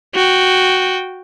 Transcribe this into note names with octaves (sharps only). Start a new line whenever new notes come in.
F#4 G5